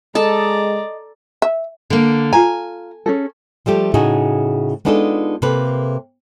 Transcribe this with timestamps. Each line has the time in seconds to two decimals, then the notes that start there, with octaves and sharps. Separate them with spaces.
0.15 G#3 A4 D5 D#5 A5 A#5
1.42 E5
1.90 D3 A#3
2.33 F4 G#5 A#5
3.06 C#4 G#4 A4
3.66 F3 G3 A3 G4
3.94 A2 C#3 D#4 F#4 G#4
4.85 G#3 B3 D4 D#4 F4 A4
5.42 C3 A#3 A4 B4